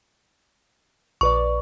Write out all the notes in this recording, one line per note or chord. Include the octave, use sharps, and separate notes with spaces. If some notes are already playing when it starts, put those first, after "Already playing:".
A#1 B4 D5 C#6